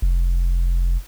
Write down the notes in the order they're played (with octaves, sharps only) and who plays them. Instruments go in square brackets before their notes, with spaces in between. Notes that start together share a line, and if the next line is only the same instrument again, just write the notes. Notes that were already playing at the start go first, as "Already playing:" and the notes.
[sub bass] F1